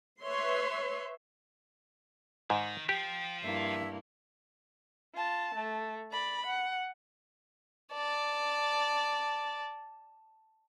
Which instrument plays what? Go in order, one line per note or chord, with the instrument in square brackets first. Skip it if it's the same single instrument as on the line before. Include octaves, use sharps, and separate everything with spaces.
[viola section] B4 C#5 E5 C6
[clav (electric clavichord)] G#2 [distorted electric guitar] D#3
[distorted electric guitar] F3 [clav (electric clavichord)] G4 [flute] G5
[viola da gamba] G2 A#3 E4 [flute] E5
[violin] F4 A5
A3
D5 B5
F#5
[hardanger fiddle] D5 A5